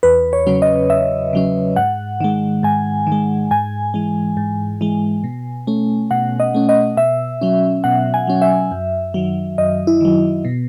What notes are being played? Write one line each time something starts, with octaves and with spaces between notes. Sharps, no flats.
E2 B4
C#5
C#3 F#3 C#4
D#5
E2 E5
C#3 F#3 C#4
G#2 F#5
D#3 G#3
G#2 G#5
D#3
G#3
G#2 G#5
E3 G#3
G#2
E3 G#3
B2
A3 C#4
B2 F#5
D#5
A3 C#4
D#5
B2 E5
F#3 C#4
B2 F#5
G#5
F#3 C#4
E5
F#2
D#3 F#3
F#2 D#5
E4
D#3 F#3
B2